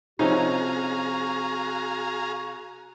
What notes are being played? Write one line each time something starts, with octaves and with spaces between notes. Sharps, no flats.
C3 F3 C#4 D#4 F#4 G#4 F5 A#5